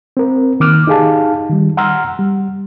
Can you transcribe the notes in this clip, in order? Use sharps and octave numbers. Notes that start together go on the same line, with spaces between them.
C4 A#4
D#3 A#3 D6 F6 F#6
D#4 G4 G#4 F5 A5
D#3 G3
F#5 A#5 C6 E6 F6
G3